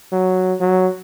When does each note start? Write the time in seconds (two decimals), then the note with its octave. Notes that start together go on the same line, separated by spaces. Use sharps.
0.12 F#3
0.60 F#3